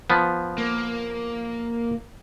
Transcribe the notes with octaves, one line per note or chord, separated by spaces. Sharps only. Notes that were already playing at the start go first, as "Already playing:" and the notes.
F3 B3
A#3